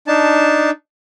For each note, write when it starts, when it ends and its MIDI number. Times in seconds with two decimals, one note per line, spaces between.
0.07 0.70 62
0.07 0.70 63
0.07 0.70 81